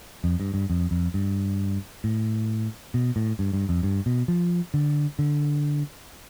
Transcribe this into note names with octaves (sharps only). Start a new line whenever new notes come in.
F2
G2
G2
F2
F2
G2
A2
B2
A2
G2
G2
F2
G2
B2
F3
D3
D3